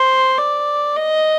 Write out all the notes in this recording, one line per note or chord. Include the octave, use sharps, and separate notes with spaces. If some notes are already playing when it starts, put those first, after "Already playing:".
Already playing: C5
D5
D#5